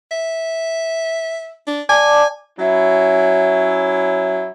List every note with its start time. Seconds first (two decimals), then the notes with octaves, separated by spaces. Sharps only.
0.11 E5
1.67 D4
1.89 D5 G#5 A5 D6
2.59 F#3 C#4 E4